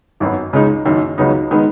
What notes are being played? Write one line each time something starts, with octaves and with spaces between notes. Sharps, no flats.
G#1 F#2 F#3 B3
C#2 C#3 G#3 D#4
F#1 F#2 D#3
C#2 C#3 F#3 B3 D#4
D#3 G#3 B3